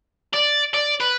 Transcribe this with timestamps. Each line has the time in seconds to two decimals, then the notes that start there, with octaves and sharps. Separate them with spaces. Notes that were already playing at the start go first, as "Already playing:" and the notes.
0.34 D5
0.74 D5
1.01 B4